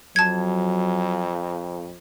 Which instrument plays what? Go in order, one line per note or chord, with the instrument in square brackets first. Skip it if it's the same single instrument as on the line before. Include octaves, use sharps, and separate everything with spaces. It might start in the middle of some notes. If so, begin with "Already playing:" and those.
[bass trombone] F2 [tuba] F#3 [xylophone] A5 G#6